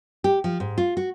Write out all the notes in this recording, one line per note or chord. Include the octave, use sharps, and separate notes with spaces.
G4
F3
G#2
F4
F#4